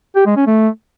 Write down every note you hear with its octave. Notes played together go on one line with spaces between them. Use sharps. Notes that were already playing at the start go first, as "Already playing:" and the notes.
G4
G#3
C#4
A3